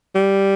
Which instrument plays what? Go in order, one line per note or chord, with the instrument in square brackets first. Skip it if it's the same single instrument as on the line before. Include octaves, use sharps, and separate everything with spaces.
[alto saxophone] G3